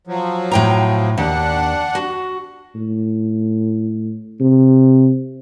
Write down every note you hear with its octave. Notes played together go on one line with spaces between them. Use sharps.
F3 F#3
A2 G5 A#5
D#2 D4 F#5
F#4
A2
C3